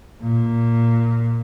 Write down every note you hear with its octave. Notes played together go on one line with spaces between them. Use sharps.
A#2